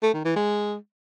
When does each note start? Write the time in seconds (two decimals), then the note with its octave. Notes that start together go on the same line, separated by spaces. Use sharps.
0.03 A3
0.14 D#3
0.25 E3
0.36 G#3